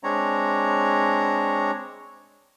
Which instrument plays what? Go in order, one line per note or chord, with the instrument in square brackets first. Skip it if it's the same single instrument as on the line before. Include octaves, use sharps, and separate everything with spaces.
[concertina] G#3 C4 D4 C#5 A#5